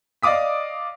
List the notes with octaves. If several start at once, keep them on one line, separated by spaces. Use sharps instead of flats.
D5 D#5 F5 D6 D#6 B6